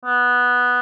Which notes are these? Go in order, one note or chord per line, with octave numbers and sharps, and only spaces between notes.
B3